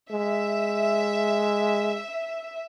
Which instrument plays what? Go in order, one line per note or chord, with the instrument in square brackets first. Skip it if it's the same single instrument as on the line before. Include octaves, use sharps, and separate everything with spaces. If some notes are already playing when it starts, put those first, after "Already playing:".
[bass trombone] G#3 [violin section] E5